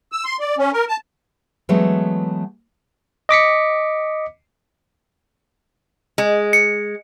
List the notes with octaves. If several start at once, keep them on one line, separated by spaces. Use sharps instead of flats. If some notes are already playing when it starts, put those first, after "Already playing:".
E6
C6
D5
C#4
A#4
A5
E3 F#3 G#3 A3 B3
D#5 D6 B6 C#7
G#3
C#7